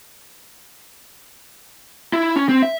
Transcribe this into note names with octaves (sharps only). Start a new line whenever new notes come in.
E4
C#4
C4
E5